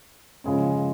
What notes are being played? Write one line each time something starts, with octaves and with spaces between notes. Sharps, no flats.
C#3 F3 G#3 C#4